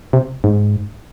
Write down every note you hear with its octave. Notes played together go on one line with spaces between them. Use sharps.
C3
G#2